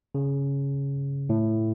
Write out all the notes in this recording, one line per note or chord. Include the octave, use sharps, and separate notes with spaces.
C#3
A2